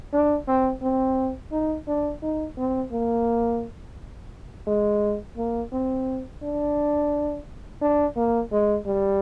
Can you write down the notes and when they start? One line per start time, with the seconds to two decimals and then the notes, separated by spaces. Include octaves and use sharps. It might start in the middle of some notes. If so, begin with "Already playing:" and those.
0.13 D4
0.47 C4
0.82 C4
1.52 D#4
1.88 D4
2.22 D#4
2.57 C4
2.91 A#3
4.67 G#3
5.37 A#3
5.72 C4
6.42 D4
7.81 D4
8.16 A#3
8.52 G#3
8.86 G3